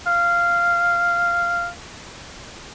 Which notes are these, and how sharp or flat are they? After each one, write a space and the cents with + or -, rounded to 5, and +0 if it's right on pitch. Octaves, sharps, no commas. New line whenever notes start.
F5 -10